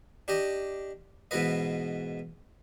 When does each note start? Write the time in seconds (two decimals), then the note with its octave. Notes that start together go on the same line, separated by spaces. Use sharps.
0.28 D4 G4 D#5
1.31 G#2 B2 E3 B4 D#5